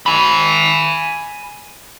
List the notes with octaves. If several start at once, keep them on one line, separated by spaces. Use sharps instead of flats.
G#5 B5